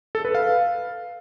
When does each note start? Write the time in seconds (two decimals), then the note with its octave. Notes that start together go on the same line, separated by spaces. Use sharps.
0.15 A4
0.25 B4
0.35 F5